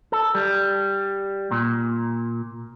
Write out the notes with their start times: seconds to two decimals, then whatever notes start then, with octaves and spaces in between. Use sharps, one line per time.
0.12 A4
0.35 G3
1.51 A#2